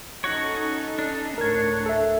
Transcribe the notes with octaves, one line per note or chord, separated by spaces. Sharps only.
C#4 D#4 F#4 A4 C#5
D4
D2 A2 A#4 C#5 G#6
A4 E5